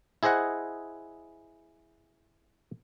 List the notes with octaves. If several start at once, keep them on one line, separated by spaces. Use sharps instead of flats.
E4 G#4 C5 D#5 F#5